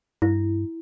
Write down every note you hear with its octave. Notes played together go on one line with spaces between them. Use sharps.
G2 E4